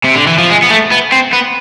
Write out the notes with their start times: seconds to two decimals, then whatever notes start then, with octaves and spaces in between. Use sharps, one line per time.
0.04 C3
0.15 D3
0.27 E3
0.38 F3
0.50 G#3
0.63 B3
0.70 A3
0.91 B3
1.12 C4
1.33 B3